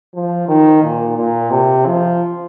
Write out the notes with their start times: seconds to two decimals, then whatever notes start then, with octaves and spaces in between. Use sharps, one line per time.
0.15 F3
0.48 D#3
0.83 A#2
1.17 A#2
1.51 C3
1.86 F3